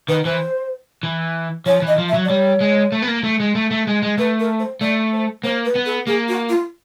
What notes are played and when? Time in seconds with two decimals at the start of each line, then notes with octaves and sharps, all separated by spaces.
0.09 D#3 B4
0.25 E3 C5
1.03 E3
1.66 F3 C#5
1.82 E3
1.87 D#5
1.98 F3
2.09 E5
2.14 F#3
2.25 D5
2.29 G3 C#5
2.61 G#3
2.92 A3
3.02 B3
3.08 A#3
3.24 A3
3.40 G#3
3.55 A3
3.71 A3
3.87 G#3
4.03 G#3
4.18 A3 B4
4.40 A#4
4.60 C5
4.81 A3 D5
5.13 C5
5.43 A#3 C5
5.65 B4
5.75 B3
5.86 A4
6.07 A#3 G#4
6.29 F#4
6.49 F4